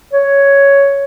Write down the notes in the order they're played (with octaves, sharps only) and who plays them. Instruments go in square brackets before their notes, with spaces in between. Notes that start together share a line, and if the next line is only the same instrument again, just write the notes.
[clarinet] C#5